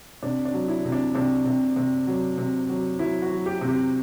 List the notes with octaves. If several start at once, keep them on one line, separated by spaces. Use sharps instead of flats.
C3 D4
D4
F#3
E4
C3
D4
C3 D4
C3
C3
F#3
C3
F#3
F#3 E4
F#4
F#3
G4
C3
G4